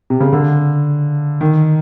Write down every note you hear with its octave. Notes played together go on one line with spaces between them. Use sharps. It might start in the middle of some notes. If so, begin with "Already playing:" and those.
C3
C#3
D3
D#3